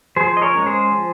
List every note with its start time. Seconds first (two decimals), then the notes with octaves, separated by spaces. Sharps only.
0.16 F3 G#4 C5
0.37 D#5
0.42 A#4 C#5
0.55 G#3 C#4
0.66 G#4 C5
0.92 F3